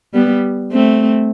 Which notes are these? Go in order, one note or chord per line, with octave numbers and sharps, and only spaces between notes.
G3 B3
A3 C4